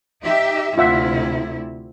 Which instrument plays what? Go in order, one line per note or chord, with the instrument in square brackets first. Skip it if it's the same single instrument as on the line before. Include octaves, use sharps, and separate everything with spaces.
[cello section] D#4 G4 E5
[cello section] D2 C3 E4 [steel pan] F4 E5 F#5